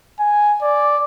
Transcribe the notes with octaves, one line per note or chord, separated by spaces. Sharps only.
G#5
D5